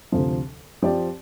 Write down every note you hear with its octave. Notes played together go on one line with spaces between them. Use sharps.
D2 C3 F3
F3 C4 G4 D5